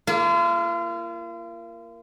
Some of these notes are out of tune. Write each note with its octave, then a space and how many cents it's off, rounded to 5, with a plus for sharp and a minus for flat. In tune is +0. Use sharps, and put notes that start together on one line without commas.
A#3 +0 F4 -40